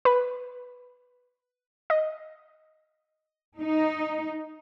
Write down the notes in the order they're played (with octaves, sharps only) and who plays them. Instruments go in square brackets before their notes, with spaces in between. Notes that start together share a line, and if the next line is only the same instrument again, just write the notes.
[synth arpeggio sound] B4
D#5
[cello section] D#4